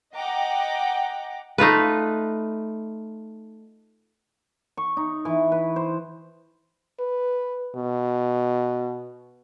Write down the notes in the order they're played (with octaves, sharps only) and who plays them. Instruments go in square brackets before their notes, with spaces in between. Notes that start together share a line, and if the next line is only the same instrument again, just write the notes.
[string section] D#5 F#5 G5 A#5 D6
[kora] A3 D#4 F4 B4
[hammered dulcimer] C#6
D#4
E3
B4
C5
[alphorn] B4
B2